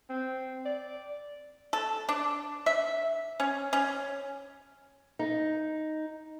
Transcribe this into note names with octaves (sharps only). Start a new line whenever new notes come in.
C4
D5
A4
D4
E5
C#4
C#4
D#4